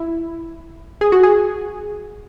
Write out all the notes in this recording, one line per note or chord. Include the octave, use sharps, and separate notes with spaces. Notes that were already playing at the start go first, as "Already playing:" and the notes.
Already playing: E4
G#4
F#4
G#4